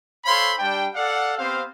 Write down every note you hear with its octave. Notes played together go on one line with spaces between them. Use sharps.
A4 C5 C#5 F5 B5 C6
G3 D4 G5
A4 D5 F5 F#5
B3 C4 G4 C5 F5